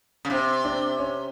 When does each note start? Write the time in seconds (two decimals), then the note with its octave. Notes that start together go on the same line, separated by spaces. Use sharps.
0.25 C#3
0.30 C3 C4
0.64 C4 D4
0.99 C#4